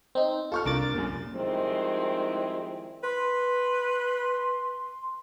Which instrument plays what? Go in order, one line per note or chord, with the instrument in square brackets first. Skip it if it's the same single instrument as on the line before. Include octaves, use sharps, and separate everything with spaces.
[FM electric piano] C4 D#4
[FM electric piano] F4 [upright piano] A4 C#6 F6
[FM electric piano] C2 D6 A6 [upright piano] D4 A#4
[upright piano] F#2 A#2
[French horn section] D#3 F3 G3 G#3 C4 E4
[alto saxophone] B4 [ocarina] C6